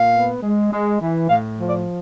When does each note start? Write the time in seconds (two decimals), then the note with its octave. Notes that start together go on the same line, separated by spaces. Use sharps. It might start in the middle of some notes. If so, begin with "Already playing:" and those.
Already playing: A#2 F5
0.12 B3
0.42 G#3
0.72 G#3
1.00 E3
1.29 A2 F5
1.59 F3
1.68 D5